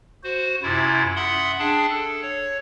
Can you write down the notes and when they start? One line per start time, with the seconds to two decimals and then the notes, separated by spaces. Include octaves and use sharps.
0.24 F#4 C5
0.63 F#2 C3 E4 F4
1.16 E5 F#5 B5 C6 D#6
1.59 D4 G#4 G5 A5
1.90 A4
2.22 C#5